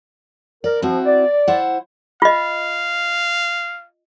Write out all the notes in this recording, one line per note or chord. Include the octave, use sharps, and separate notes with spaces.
A#4 D5
F3 C4 E4 F#4
D5
E4 C5 F#5
F4 D#5 F5